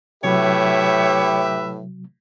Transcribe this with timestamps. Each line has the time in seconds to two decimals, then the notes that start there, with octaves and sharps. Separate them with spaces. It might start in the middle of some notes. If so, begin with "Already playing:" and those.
0.24 A2 C3 F#3 G4 B4 C#5 E5